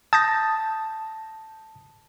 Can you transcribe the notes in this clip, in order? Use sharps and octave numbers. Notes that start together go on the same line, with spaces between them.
A5 D#6 G6 A#6